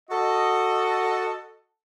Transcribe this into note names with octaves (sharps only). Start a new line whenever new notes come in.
F#4 A4 D#5